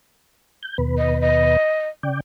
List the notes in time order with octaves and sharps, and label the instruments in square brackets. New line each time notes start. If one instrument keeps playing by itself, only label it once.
[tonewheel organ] G6
D#2 B2 B4
[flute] D#5
D#5
[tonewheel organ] C#3 D5 G5